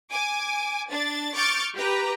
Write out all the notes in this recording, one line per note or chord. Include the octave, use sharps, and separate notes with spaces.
G#5 D6
D4 A6
C#6 D6 F6 G6 A6
G4 B4 A#5